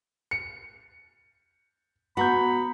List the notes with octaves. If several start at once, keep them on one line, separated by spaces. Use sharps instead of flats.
C#7
B3 F#4 A#5 B5 G6